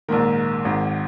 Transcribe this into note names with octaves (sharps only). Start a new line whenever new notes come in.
A#1 G#2 D#3 A#4
G#1 G#2 D#3